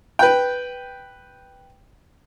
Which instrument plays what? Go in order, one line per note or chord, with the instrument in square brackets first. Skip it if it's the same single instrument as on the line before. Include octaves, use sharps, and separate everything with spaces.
[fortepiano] B4 G5